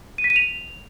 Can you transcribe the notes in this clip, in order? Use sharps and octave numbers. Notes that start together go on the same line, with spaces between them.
D#7
B6
D#7
F7